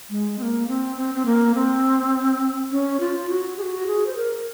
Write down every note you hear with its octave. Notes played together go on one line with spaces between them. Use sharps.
G#3
C4
A#3
C4
C4
C4
A#3
C4
C#4
F4
F#4
G#4
F#4
G#4
C5
A#4